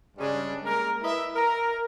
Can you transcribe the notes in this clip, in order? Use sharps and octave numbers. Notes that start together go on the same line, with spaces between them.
G2 C#3 G3 G#3 D4
G#3 A#3 A#4
E4 B4 D#5 E5
A#4